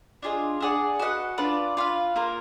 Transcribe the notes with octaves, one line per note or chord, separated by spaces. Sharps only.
D4 F4 G#4 D#5
D4 G#4 D5 F#5
F#4 B4 D#5 F#5
D4 F4 B4 D5
F4 B4 F5
A#3 F4 A#4